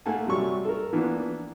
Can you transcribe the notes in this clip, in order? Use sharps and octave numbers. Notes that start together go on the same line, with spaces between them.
A3 A#3 F#5 G#5 A5
C3 F#3 G3 C#6
A4 A#4
E3 F3 A#3 B3 D4